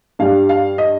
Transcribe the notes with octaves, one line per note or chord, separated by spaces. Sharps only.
G2 G3 F5
F5
D#5